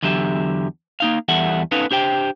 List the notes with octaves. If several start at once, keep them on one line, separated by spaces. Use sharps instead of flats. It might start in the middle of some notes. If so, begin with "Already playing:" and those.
E2 D3 F#3 G4 E5
A#3 D#4 F5
E2 E3 G3 A4 E5 F#5
B3 C#4 D#4 A4 B4 F5
D4 G4 C5 G5